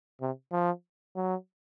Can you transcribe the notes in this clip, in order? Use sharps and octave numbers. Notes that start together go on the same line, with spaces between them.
C3
F3
F#3